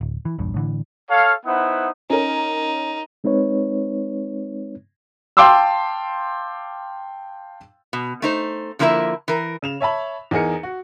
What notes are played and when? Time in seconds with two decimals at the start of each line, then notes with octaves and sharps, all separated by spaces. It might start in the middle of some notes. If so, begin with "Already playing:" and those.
0.01 D1
0.25 E3
0.38 A#1 E2 G2
0.54 A2 D3 E3
1.11 A4 C#5 F5
1.46 B3 D#4 E4 C5 F#5
2.10 C#4 D#4 A#4
3.24 G#3 C4 D#4 B4 C#5
5.37 F5 G5 A5 C6 D6 E6
7.93 B2
8.22 A3 D#4 C5
8.79 D3 F3 A#3 E4 A#4 E5
9.28 E3 A#4
9.62 C#3 E7 F7
9.80 C#5 E5 A5 B5
10.31 E2 D#4 G#4 A#4 C#7
10.63 F#4